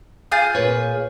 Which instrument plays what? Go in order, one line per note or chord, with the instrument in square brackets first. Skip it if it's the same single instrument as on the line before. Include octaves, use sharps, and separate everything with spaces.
[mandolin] F4 G#4 G6
[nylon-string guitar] A#2 B4 C#5